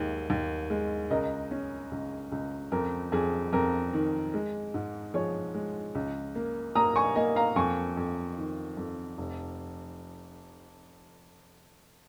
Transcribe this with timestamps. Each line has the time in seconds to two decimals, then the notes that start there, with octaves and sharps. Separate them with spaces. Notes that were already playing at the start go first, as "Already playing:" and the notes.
Already playing: D#2 G#3
0.30 D#2
0.70 G#3
1.10 C#2 A#4 D#5
1.51 C#4
1.91 C#2
2.32 C#2
2.72 F2 A#4
3.12 F2 G#4
3.53 F2 A#4
3.93 D#3
4.34 G#3
4.74 G#2
5.14 F3 G#4 C#5
5.54 G#3
5.95 C#2
6.35 A#3
6.75 A#3 A#5 D#6
6.96 G#5 C#6
7.16 A#3 D#5 G#5
7.36 F5 A#5
7.56 F2 G#5 C#6
7.97 F2
8.37 D#3
8.77 F2
9.18 F1